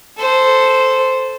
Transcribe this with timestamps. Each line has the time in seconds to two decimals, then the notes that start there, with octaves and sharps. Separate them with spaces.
0.18 A4 C5